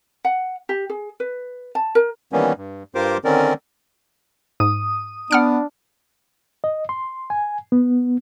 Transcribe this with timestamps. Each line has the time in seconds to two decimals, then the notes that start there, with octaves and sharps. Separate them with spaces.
0.25 F#5
0.69 G4
0.90 G#4
1.20 B4
1.75 A5
1.95 A#4
2.32 D#3 E3 G3 A#3 B3 C#4
2.57 G2
2.95 G2 F4 G4 A#4 C5 D6
3.24 D3 D#3 C4 C#4 A#4 D5
4.60 G#2 D#6
5.31 B3 D4 F#5 F6 D7
6.64 D#5
6.89 C6
7.30 G#5
7.72 B3